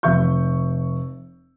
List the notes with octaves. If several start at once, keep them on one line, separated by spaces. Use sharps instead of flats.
F1 E5 C#6 G6